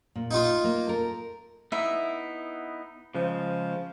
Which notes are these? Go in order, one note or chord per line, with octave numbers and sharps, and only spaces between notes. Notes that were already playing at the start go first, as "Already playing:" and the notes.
A#2
D#4 F4
A#3
A4 A#4
B3 D#4 E4 E5
C#3 F3 G#3